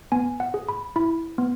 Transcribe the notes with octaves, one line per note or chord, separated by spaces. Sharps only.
B3 G#5
F#5
G#4
B5
E4 B5
B3